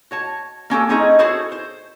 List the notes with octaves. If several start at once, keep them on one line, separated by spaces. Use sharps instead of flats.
F#4 C#5 A5
A#3 C#4 G4 A4
C4 C#4 D#4 E4 G#4 D#5
E4 F#4 G#4 A4 C5 C#5
C5